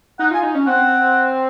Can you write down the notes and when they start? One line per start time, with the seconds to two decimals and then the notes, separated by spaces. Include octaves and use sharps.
0.19 D#4 F#5
0.31 F4 G#5
0.43 D#4
0.55 C#4
0.67 C4 F#5